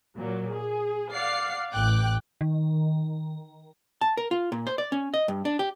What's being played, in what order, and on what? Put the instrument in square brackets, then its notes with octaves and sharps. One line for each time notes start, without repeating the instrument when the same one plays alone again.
[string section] A#2 F#3
G#4
D5 F5 F#5 C7
A1 G5 D6 F#6
[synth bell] D#3
[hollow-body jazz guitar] A5
A#4
F4
A#2
C5
D5
C#4
D#5
G2
D4
G4